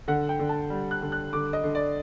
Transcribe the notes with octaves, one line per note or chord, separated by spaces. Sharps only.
D3 F#5
G5
D3
A5
G3
F#6
D3
F#6
D3 D6
D#5
D3
D5